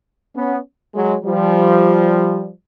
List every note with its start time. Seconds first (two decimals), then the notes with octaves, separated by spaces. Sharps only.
0.35 B3 C#4
0.94 F#3 G#3
1.25 F3 G3